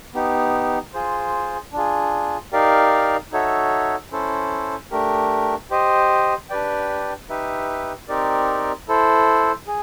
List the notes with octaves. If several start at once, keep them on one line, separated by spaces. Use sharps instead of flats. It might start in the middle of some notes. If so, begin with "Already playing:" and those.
B3 D#4 G4
F4 G#4 C5
D4 F4 G#4
D#4 G4 A#4 D5 F5
D#4 F#4 A4 C#5 E5
C#4 E4 A4 C5
A3 D4 G4 A#4
G4 C5 D#5
D4 G4 B4 D5 G5
D#4 G4 B4 E5
C4 D#4 G4 A#4 D5
E4 A4 C5
G#4